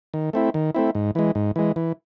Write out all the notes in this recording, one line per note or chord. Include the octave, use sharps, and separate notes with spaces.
D#3
A3 C4 E4
D#3
A3 C4 E4
G#2
E3 G#3
G#2
E3 G#3
E3